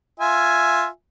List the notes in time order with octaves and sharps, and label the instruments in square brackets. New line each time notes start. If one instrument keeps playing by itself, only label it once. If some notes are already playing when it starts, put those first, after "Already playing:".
[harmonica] F4 E5 G#5